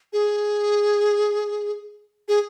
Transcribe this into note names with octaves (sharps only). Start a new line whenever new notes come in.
G#4
G#4